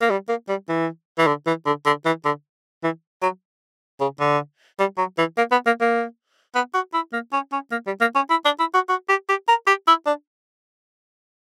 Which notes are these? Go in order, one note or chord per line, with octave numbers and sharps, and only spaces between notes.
A#3
G3
A#3
G3
E3
E3
D3
E3
D3
D3
E3
D3
E3
F#3
C#3
D3
G3
F#3
E3
A#3
B3
A#3
A#3
B3
F#4
E4
A#3
C#4
C#4
A#3
G3
A#3
C#4
E4
D4
E4
F#4
F#4
G4
G4
A#4
G4
E4
D4